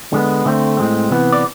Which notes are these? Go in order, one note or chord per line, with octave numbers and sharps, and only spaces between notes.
D3 G#3 B3
D3 A3 C4
A2 G#3 C4
C3 E3 B3
D5